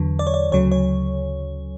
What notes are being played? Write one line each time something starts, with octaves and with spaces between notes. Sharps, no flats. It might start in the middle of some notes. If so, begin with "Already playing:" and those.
Already playing: E2 D3 F#3
D5
C#5
D5
D2 C#3 F#3 C#5
C#5